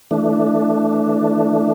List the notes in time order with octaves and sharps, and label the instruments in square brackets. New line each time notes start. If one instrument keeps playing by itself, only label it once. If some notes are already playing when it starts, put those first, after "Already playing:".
[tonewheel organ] E3 A3 D4